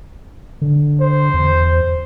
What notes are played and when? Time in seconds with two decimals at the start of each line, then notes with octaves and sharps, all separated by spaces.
0.62 D3
1.01 C5
1.34 E2